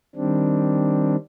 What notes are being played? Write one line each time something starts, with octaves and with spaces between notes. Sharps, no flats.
D#3 G3 C4 D4